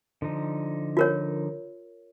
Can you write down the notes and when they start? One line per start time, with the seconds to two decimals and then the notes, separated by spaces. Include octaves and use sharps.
0.22 D3 F3 D#4
0.97 F4 A#4 C#5